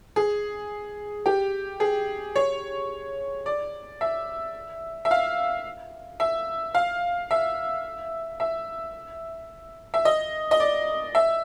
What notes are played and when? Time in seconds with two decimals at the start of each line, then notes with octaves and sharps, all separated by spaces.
0.16 G#4
1.26 G4
1.80 G#4
2.36 C#5
3.46 D5
4.01 E5
5.05 E5
5.11 F5
6.20 E5
6.74 F5
7.31 E5
8.40 E5
9.94 E5
10.05 D#5
10.51 D#5
10.60 D5
11.15 E5